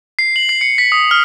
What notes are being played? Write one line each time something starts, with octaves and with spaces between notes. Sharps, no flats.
C7
F#7
C7
C#7
B6
D#6
F6